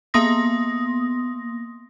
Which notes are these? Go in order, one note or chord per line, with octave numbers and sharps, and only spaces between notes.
A#3 B3 C6 D#6 A#6